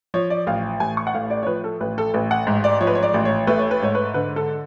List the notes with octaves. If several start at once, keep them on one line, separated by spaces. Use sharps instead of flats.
F3 C#5
D5
A1 F5
A1 G#5
C#6
F#5
A2 F5
D5
C#5
F3 B4
A4
A1 B4
A4
A1 B4
F#5
G#2
D5
F3 C#5
B4
C#5
D5
A1
C#5
A3 B4
C#5
B4
G#2 C#5
B4
D3 B4
A4